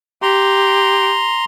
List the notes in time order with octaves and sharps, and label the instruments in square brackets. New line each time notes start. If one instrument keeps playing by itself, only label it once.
[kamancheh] G4 [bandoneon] A#5 C6